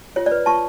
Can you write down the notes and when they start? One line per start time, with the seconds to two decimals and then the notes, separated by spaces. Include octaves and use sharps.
0.16 F4 C#5
0.26 D5
0.31 B4
0.46 F4 A5 C#6